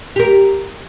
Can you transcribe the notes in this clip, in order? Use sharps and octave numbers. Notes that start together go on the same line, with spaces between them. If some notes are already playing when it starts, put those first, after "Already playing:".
G4 A#4